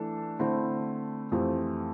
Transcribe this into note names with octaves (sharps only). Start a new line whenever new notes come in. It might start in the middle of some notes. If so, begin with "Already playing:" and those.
Already playing: E3 A3 D4 A4
D3 A3 C4 E4
F2 E3 A3 C4 G4